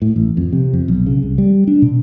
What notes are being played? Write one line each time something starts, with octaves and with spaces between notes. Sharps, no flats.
A2
A1
F2
C3
F2
B1
C#3
C2
G3
D4
B2